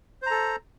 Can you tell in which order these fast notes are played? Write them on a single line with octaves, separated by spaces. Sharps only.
C5 A#5 A4